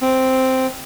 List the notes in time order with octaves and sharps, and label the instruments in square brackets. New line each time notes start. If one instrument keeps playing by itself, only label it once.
[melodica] C4